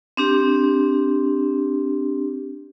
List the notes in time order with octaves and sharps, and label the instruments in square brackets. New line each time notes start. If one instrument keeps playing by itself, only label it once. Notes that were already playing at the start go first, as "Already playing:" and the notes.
[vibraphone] C4 D4 G4